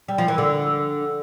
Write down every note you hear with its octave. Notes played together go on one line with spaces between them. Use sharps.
G3
F3
E3
D3